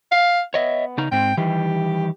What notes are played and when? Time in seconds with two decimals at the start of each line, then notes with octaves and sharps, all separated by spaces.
0.11 F5
0.54 B3 C#5 D#5 E5
0.98 C#3 D#4 A#5
1.12 G#2 C4 G5
1.37 D#3 E3 G3 G4